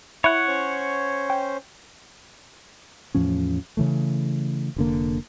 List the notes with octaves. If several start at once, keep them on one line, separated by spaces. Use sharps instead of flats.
E4 C#5 F#5
C#4 C5
G5 G6
E2 A2 F3 C#4
C#3 E3 A3
F1 D3 A#3